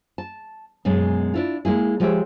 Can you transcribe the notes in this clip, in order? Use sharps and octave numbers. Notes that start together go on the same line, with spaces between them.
A5
F#2 B2 G#3
D4 E4 F4
G#3 A#3 E4 G#4
F3 G#3 G4 C#5 E5